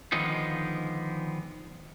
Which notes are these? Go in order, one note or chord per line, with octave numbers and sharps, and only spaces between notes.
D3 D#3 F3 G#3 B3 D#4